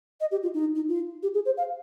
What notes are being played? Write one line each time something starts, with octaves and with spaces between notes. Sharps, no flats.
D#5
G4
F4
D#4
D#4
F4
G4
G#4
C5
F5